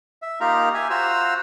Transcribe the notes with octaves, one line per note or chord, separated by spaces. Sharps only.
E5
A#3 D#4 F4 G4 A#4 A#5
G4 E5 G#5
F4 F#4 C5 A#5 E6